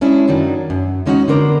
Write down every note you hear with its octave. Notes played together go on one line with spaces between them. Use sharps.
G#3 C#4 D4 E4
F#2 D#3 F#3 D4 D#4
F#2
E2 G#3 C#4 D#4 F#4 F#5
D3 B3 D4 A#4 C5